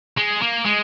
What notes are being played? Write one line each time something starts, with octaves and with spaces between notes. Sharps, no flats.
G#3
A#3
G#3